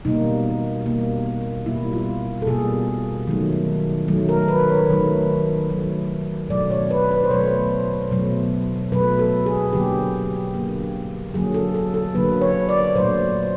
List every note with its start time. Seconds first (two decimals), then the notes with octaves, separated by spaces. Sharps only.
0.05 B2 G3 A#3 D#4
0.86 B2 G3 A#3
1.66 B2 G3 A#3 E4
1.93 F4
2.42 A4
2.47 B2 G3 A#3 G#4
3.27 D#3 F#3 A3
4.08 D#3 F#3 A3
4.29 A#4
4.48 B4
4.69 C#5
4.89 D#3 F#3 A3
5.69 D#3 F#3 A3
6.50 B2 F#3 A3 D5
6.70 C#5
6.90 B4
7.11 B4
7.24 C5
7.31 B2 F#3 A3 C#5
8.11 B2 F#3 A3
8.92 B2 F#3 A3 B4
9.19 A4
9.46 G#4
9.73 D3 F#3 A#3 G4
10.54 D3 F#3 A#3
11.34 D3 F#3 A#3 G#4
11.54 A4
11.74 A4
11.94 A4
12.15 D3 F#3 A#3 B4
12.41 C#5
12.69 D5
12.95 A#2 F#3 A3 C5